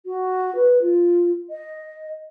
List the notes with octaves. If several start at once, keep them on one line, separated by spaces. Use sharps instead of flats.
F#4
B4
F4
D#5